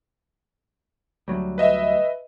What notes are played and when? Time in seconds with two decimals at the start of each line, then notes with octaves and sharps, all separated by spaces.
1.28 D2 F#3 G3
1.58 B4 D#5 E5